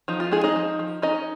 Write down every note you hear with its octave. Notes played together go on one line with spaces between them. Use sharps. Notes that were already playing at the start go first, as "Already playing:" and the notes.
F3 D#4
F4
G#3 D#4 G#4
D#4 D#5
F3
F3
C#4 D#4 D#5